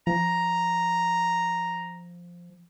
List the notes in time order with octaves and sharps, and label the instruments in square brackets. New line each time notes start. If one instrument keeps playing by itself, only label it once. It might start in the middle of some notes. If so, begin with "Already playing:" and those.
[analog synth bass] F3 [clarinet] A#5